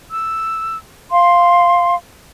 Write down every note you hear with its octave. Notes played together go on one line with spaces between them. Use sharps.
E6
F5 C6